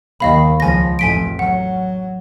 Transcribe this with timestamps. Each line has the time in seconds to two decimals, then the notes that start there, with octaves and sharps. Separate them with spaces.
0.20 D#2 D#3 D#5 F5 B5
0.60 C#2 F3 G#5 A#6
0.99 A1 F2 G#5 B6 D7
1.39 F#3 F#5